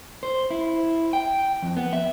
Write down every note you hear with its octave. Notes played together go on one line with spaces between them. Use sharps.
C5
E4
G5
F2
B3
E5